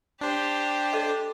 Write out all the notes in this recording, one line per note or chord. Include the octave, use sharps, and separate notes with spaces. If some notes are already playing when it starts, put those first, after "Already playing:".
D4 G4 C5
A4 C#5 D#5